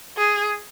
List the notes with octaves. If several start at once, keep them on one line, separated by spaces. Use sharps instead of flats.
G#4